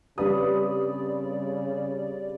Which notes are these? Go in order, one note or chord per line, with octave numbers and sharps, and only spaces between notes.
G2 C#3 G3 C4 D5 B5 D#6